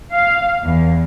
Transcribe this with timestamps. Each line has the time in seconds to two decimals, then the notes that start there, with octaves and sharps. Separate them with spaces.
0.14 F5
0.63 E2